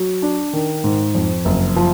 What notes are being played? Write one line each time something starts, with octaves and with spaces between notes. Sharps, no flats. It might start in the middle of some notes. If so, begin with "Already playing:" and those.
Already playing: F#3
D4
D#3
G#2
F2
F#1
F3